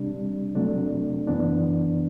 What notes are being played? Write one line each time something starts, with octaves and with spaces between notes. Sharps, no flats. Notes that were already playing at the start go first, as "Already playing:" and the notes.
Already playing: C3 G3 D4
C3 F#3 A3 D4
F#2 E3 B3 D4